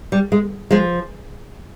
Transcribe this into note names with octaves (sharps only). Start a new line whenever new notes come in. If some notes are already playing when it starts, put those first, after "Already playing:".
G3
G#3
F3 G#3